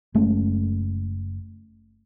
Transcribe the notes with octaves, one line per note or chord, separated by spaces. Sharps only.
F#1 G#3 A3 C#4